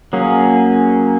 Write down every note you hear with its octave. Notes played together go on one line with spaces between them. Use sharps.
F#3 A#3 C#4 G#4